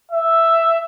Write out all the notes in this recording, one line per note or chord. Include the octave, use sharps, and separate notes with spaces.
E5